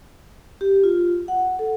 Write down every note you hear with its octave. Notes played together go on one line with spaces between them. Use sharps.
G4
F4
F#5
A4